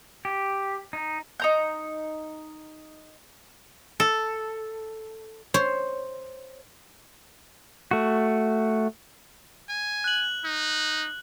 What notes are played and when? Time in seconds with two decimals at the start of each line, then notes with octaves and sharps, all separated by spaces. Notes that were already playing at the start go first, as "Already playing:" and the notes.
0.25 G4
0.93 D#4
1.40 D#4 A#5 G6
4.00 A4
5.54 C5 C#5
7.91 A3 F#4
9.69 G#5
10.04 F#6 F#7
10.45 D#4